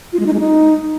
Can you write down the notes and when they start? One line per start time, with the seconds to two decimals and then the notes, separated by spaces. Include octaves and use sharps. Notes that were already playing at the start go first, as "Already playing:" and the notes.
0.13 F4
0.19 G#3
0.26 D#4
0.33 G#3
0.40 D#4